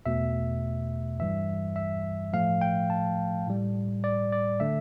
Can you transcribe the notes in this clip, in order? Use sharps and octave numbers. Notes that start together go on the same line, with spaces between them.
E2 B2 A3 E5
G2 E3 G3 E5
E5
A2 F3 A3 F5
G5
A5
A2 G3
D5
D5
D3 A3 E5